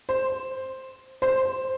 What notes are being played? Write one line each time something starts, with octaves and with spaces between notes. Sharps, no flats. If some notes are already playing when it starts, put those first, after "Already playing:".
C5
C5